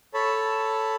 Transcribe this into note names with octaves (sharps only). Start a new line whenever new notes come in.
A4 C#5 A5 B5